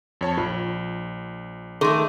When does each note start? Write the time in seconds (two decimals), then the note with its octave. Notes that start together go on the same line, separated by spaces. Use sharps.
0.21 F2 C#5 A5
0.38 A#1 F4
1.81 D#3 A3 G#4 C6